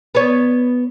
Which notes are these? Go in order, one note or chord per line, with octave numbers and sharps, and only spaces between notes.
B3 C#5